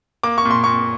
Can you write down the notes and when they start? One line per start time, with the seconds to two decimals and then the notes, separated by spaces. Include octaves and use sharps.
0.23 A#3 D6
0.38 C#6
0.45 A#2
0.51 C6
0.64 A#2 C#6